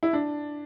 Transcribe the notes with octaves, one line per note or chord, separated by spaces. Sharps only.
E4
D4